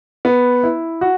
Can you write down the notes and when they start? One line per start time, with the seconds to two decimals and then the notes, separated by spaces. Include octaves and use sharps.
0.25 B3
0.63 E4
1.01 F#4